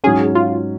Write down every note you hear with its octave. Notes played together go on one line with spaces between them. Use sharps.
G#2 F#3 C#4 G#4
F4